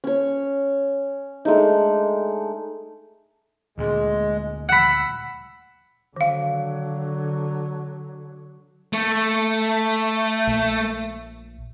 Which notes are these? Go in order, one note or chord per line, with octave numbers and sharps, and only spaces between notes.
C#4 C#5
G#3 A3 D4 D#4
D2 A#2 G#3
F#5 B5 E6
D3 D#3 F#3 F5
A3
A#1